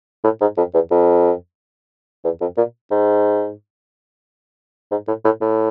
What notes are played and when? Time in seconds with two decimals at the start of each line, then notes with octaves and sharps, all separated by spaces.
0.24 A2
0.41 G#2
0.58 F2
0.74 E2
0.91 F2
2.24 E2
2.41 F2
2.58 A#2
2.91 G#2
4.91 G#2
5.08 A2
5.25 A2
5.41 A2